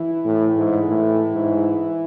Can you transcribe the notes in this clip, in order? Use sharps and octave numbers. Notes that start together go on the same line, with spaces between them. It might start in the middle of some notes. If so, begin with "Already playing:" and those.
Already playing: E3
A2
G#2
A2
G#2